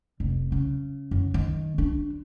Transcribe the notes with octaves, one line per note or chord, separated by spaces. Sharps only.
F1
C#3
F#2
D#3
D4